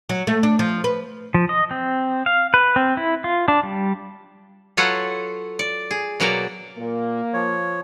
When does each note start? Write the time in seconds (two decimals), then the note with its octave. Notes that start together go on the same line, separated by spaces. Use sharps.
0.09 F#3
0.27 A3
0.43 D4
0.59 F3
0.84 B4
1.34 F3
1.49 D#5
1.71 C4
2.26 F5
2.54 B4
2.76 C4
2.97 E4
3.24 F4
3.48 D4
3.63 G3
4.77 F#3 F4 A4 B4 C#5 F#5
5.59 D5
5.91 G#4
6.20 B2 F#3 A#3 D5 A#5
6.78 A#2 A#3
7.33 F3 C#5